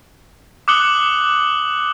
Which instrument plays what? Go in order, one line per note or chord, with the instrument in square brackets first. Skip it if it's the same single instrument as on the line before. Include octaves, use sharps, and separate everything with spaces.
[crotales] D6 D#6 F#6 C#7 F#7 G7